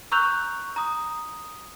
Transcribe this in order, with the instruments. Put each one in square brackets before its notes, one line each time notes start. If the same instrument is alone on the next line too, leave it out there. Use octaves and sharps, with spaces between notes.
[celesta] A#5 C#6 E6 F#6 G6 F7
A#5 D#6